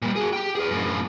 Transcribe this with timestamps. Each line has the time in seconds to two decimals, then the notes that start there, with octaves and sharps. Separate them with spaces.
0.02 A#2 G3
0.16 F#4 G#4
0.33 G4 G5
0.55 G#4 B4
0.71 F#2 A2